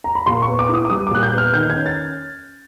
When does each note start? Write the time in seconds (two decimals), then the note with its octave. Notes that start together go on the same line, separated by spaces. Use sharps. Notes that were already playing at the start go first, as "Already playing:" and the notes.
0.04 A#5
0.15 B5
0.26 A#2 C6
0.42 C#6
0.48 B3
0.59 D6
0.69 E4 D#6
0.85 D6
0.90 G3 D#6
1.07 D6
1.11 A#2 F#6
1.23 G6
1.32 B3
1.38 F6
1.54 D#3 G6
1.70 G#6
1.76 C#4
1.86 A6